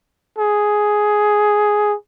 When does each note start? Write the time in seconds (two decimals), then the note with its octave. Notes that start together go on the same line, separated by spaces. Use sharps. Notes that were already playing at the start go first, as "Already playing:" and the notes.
0.38 G#4